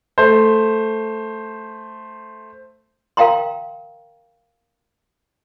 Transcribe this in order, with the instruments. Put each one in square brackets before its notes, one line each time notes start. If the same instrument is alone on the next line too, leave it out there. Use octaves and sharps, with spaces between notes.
[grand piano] A3 C5
[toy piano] A#4 F5 G5 A#5 C6